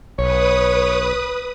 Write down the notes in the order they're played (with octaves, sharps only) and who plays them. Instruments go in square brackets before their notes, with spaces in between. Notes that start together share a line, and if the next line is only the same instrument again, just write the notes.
[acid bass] B1 [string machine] B4 D#6 [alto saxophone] C#5